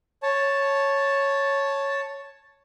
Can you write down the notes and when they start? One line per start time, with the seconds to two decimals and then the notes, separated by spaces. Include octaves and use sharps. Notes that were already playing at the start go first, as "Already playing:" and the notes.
0.23 C#5 A5